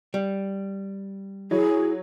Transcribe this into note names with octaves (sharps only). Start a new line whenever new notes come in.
G3
F#3 E4 G#4 C#5